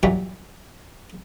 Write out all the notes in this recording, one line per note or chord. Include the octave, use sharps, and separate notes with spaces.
A#2 E3 F#3 G3 C#6